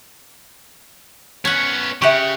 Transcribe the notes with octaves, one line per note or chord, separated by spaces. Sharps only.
B3 C#4 C#5 F#5
C#3 G4 E5 F#5 C#6